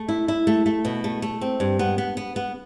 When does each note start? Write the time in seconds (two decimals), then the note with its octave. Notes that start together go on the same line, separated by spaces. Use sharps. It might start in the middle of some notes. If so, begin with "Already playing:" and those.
Already playing: A3
0.09 E4
0.28 E4
0.47 A3
0.66 A3
0.85 B2
1.04 A3
1.22 A3
1.41 C4
1.60 G2
1.79 B3
1.98 B3
2.17 B3
2.36 B3